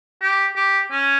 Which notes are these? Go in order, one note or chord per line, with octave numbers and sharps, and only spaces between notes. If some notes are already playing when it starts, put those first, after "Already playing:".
G4
G4
C#4